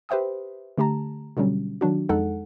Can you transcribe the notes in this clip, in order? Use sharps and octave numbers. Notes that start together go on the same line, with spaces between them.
G4 B4 C5 E5 G5 D#6
D3 A3 G4 A5 A#5
B2 D3 F#3 G3 C#4
D#3 F#3 D4 F#4
F2 G#3 D#4 A4 F#5